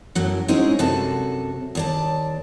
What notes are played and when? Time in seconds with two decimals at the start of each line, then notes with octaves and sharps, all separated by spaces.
0.15 F#2 A2 F#3
0.48 G#3 C4 C#4 D#4 E4 G#4
0.79 F#2 C3 F#4 A4 A5
1.75 D#2 D5 A5